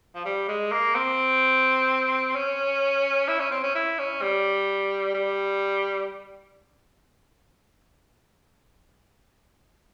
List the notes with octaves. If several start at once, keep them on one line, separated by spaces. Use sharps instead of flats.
F3
G3
G#3
A#3
C4
C#4
E4
C#4
C4
C#4
E4
C#4
G3
G3